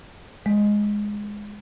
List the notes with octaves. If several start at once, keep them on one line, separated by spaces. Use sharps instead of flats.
G#3